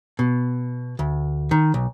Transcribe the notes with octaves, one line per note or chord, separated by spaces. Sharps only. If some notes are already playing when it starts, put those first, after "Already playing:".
B2
D2
D#3
B1